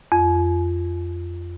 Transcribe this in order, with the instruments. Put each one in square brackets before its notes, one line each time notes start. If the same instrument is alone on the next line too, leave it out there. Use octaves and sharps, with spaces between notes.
[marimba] F2